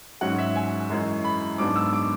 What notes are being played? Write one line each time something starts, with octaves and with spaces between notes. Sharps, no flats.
G#2 F#3 C#4 F#5
E5
G#5
F#2 E3 G#3 C#4
B5
G#2 F#3 B3 D4 D6
E6
D6